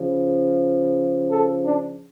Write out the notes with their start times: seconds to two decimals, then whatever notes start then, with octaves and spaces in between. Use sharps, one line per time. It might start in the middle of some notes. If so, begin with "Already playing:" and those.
Already playing: C#3 F3
1.30 A4
1.64 D4